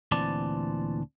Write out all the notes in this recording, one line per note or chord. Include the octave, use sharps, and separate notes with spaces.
D2 A#2 E3 C4 D5 A5